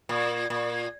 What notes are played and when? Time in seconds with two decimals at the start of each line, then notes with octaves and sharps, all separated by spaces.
0.09 A#2
0.50 A#2